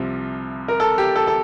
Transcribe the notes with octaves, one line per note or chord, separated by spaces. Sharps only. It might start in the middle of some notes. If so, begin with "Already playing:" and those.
Already playing: C2 C3 F3
A#4
A4
G4
A4
A4